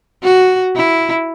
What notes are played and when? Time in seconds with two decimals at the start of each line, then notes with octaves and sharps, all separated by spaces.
0.23 F#4
0.75 E4